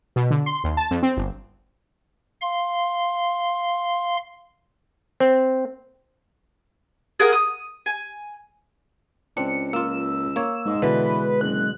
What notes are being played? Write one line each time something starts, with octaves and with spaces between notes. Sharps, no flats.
B2
D3
C6
D#2
A5
F2
C4
G1
F5 C6
C4
G#4 A#4 F5 F#5
D#6
G#5
C#2 C4 D4 C#7
A#3 F4 E6
A#3 C#5
G#2 G#3
B2 D3 E3 B4
F#1 F#6